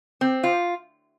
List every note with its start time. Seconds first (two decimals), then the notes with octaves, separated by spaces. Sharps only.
0.21 C4
0.44 F4